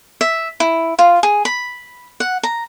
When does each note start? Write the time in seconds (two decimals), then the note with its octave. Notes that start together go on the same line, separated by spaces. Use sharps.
0.21 E5
0.60 E4
0.99 F4
1.23 G#4
1.45 B5
2.20 F#5
2.43 A#5